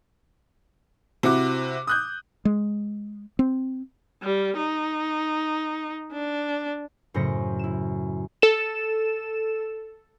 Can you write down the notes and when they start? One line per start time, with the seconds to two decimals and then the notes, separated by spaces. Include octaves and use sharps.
1.23 C3 E4 F#4 D6
1.87 D#6 F#6 G6
2.45 G#3
3.39 C4
4.23 G3
4.57 D#4
6.12 D4
7.14 F#2 A2 C#3 C5 A#6 C#7
7.59 E4 E7
8.42 A4 E7